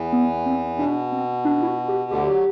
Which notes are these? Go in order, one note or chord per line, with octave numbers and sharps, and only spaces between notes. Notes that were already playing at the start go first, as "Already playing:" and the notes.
Already playing: E2 E3
B3
C4
B2 D4
C4
D4
E4
F#4
G4
D2 D3 G4
F#3